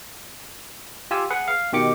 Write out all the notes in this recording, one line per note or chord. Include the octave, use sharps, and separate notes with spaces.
F4 G4 G#5 E6
G#4 B4 F#5
F5
B2 D#3 G4 D6 C#7